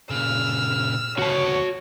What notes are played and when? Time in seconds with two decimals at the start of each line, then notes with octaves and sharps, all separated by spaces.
0.11 A#2 C#3 E6 F6
1.19 D2 B3 F#4 C#5 A5